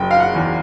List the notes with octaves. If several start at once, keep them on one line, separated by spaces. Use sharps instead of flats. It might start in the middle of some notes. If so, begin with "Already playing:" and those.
Already playing: F#1 G5
F5
F#5
E2